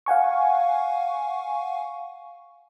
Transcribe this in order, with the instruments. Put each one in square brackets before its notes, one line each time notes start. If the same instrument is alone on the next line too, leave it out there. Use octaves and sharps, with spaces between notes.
[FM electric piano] F5 F#5 G#5 C#6